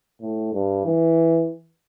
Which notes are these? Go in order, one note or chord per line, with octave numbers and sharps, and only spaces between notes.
A2
G2
E3